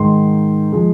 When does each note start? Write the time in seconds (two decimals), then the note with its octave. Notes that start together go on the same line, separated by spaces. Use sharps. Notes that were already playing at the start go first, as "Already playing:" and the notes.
Already playing: G#2 D#3 G#3 C6
0.73 F3 G#3